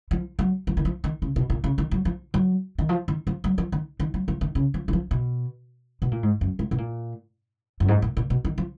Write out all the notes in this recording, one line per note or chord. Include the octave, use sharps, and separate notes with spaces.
F3
F#3
F3
D#3
F3
D#3
C#3
B2
A#2
C#3
D#3
F#3
F3
F#3
D#3
F3
D#3
F3
F#3
F3
D#3
D#3
F#3
F3
D#3
C#3
F3
D#3
F3
B2
B2
A#2
G#2
F#2
G#2
B2
A#2
F#2
G#2
A#2
A#2
B2
D#3
F3